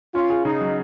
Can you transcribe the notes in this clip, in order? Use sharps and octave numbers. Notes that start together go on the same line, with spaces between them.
C#4 F4
G#4
C#3 D#4
F#3